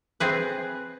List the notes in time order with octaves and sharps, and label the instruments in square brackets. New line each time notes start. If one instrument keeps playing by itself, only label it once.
[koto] C4 G#4 B4